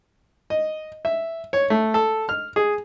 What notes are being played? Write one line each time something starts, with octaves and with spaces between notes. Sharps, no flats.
D#5
E5
C#5
A3
A4
F6
G#4